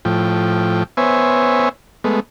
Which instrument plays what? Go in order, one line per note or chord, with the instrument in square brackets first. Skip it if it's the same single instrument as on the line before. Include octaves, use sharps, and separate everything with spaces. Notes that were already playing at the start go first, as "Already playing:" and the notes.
[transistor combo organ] A2 F3 G5
B3 C5 C#5 E5 G#5
G#3 A3 B3